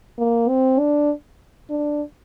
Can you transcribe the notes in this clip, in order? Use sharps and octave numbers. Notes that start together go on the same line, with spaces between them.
A#3
C4
D4
D4